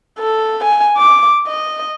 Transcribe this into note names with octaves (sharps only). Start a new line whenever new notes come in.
A4
G#5
D6
D#5